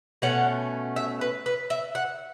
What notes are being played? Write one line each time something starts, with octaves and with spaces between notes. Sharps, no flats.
B2 A3 C#4 F#5
E5
B4
B4
E5
F#5